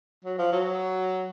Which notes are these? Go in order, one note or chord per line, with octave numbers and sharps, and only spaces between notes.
F#3
F3
F#3